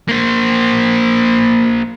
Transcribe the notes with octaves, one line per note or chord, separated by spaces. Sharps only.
A#3 C5